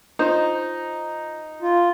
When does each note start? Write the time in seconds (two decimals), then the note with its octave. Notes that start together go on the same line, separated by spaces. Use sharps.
0.19 D#4 F4 C5
1.62 F4